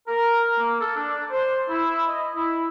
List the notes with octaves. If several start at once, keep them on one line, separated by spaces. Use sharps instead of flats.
A#4
A#3
A4
D4
C5
E4
D#5
E4